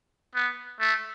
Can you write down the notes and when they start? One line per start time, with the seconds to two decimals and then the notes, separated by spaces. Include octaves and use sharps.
0.35 B3
0.80 A3